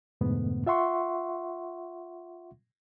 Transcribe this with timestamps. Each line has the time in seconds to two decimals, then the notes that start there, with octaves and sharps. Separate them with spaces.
0.21 F2 G#2 B2 D3 A3 B3
0.67 F4 E5 F#5 C6 C#6